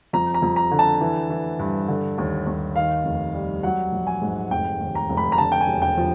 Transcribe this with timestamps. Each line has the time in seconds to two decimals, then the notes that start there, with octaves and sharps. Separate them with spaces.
0.13 F2 A#5
0.34 A#5
0.42 F2
0.56 A#5
0.71 D3
0.79 A5
1.01 E3
1.30 E3
1.59 G2
1.88 D3
2.18 D#2
2.47 D#2
2.76 D#3 F5
3.05 F1
3.34 G3
3.63 F#3 F#5
3.92 A#1
4.07 G#5
4.22 G#2
4.51 F1 G5
4.80 D#2
4.95 A#5
5.09 F1
5.17 B5
5.32 A#5
5.38 D3 A5
5.52 G5
5.61 G#5
5.67 E1
5.82 G5
5.97 F3